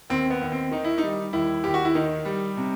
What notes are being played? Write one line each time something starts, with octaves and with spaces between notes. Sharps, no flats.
D#2 C4
B3
D#2
C4
D#3 D#4
E4
G3 D#4
D#2 E4
D#2 G4
F#4
E4
D#3 D#4
G3
C3